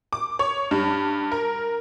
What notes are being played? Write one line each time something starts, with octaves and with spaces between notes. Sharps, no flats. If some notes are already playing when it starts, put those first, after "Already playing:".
D6
C#5
G2
A#4